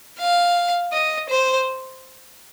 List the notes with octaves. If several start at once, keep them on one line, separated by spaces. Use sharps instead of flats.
F5
D#5
C5